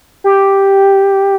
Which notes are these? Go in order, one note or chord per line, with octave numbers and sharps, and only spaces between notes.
G4